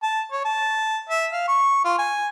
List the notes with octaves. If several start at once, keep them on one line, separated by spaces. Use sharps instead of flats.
A5
C#5
A5
E5
F5
C#6
F4
G#5